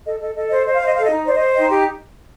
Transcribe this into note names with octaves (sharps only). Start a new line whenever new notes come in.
A4 D#5
A4 D#5
A4 D#5
C5 D#5
C5 D#5
F5
C5 D#5
A4 F5
D#5
D#4
C5 D5
D#5
C5
D#4 D#5 G5
G4